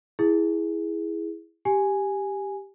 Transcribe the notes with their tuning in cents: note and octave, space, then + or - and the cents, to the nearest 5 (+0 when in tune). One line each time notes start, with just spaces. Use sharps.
E4 +0 G#4 +0
G4 +0 G#5 +0